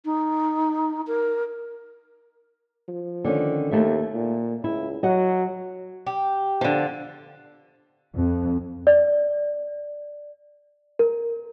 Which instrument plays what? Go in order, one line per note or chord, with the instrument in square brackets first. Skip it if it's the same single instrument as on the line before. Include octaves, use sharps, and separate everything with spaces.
[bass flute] D#4
A#4
[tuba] F3
[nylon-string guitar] D3 D#3 C#4
[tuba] D#2 [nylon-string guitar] A3 E5
[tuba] A#2
[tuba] C#2 [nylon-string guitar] E4
[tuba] F#3 [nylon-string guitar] D#5 F#5
[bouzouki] G4
[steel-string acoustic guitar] D3 F3
[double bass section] F2
[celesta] D5
A#4